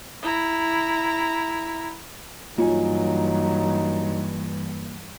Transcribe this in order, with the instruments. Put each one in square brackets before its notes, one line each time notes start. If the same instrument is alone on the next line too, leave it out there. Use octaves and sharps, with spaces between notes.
[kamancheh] E4 A#5
[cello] G2 E3 [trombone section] F#3 D#4 [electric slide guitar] A#3 C#5 G#5 [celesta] F4